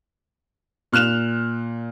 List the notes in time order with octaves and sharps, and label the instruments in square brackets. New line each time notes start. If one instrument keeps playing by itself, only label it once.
[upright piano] A#2 F6 F#6 E7 F7